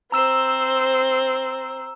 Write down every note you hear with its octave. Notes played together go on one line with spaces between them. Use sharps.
C4 C5 A#5 E6 E7